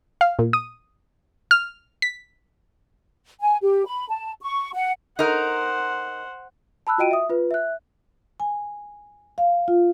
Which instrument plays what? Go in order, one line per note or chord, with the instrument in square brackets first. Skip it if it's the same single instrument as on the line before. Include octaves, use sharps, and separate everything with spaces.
[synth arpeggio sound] F5
A#2
D#6
F6
B6
[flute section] G#5
G4
B5
A5
C#6
F#5
[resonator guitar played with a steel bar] D#4 A#4 [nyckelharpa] C5 F#5
[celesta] A5 B5 E6 F#6
F4 F#4 D#5 G5 D7 D#7
E5 D#6
F4 B4
E5 F#6
[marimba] G#5
F5
F4